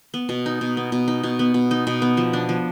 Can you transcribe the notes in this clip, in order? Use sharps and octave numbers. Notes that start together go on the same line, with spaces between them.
B3
B2
D#4
B2
B3
B2
D#4
B2
B3
B2
D#4
B2
B3
F3
D4
F3